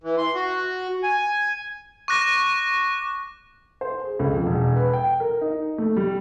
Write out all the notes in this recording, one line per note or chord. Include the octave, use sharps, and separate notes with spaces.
E3
C6
F#4
G#5
C#6 D6 F#6 A#6
C5
G#4
C#2
F2
E1
B4
G5
A#4
D#4
A3
G3